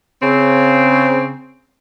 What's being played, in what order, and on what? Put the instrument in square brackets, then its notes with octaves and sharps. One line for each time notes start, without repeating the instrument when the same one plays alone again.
[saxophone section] C#3 C4